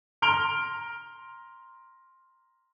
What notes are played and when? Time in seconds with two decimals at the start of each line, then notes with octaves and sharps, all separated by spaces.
0.22 A#5 C6 F6 D7 F7 G7